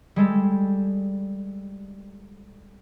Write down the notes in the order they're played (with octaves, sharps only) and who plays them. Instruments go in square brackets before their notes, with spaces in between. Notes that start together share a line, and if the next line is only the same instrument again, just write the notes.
[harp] G3 G#3 A4